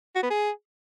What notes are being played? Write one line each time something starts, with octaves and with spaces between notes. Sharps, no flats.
F#4
B3
G#4